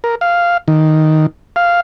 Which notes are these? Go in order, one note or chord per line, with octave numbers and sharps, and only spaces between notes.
A#4
F5
D#3
F5